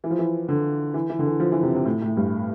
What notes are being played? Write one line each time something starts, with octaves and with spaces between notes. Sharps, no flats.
E3
F3
E3
D3
E3
E3
D3
E3
F3
E3
C3
C3
A2
A2
G2